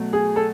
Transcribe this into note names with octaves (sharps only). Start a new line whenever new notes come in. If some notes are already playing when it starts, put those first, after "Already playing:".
Already playing: B2 F#3 A3
G#4
A4